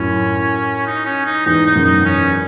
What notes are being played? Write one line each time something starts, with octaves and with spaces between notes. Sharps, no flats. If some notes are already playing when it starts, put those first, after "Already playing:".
Already playing: F#2 A2 C#4
D#4
C#4
D#4
E2 G#2 D#4
D#4
F#2
D#4
C#4